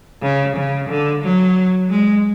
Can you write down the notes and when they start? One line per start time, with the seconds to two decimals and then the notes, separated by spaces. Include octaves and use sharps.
0.22 C#3
0.56 C#3
0.89 D3
1.23 F#3
1.90 G#3